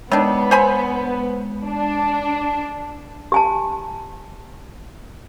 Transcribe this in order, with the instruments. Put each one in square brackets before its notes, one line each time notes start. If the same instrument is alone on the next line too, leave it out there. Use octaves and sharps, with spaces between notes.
[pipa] D#3 D4 [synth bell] G#3 [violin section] B3
[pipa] C5 G#5 B5
[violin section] D4
[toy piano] G4 G#5 A5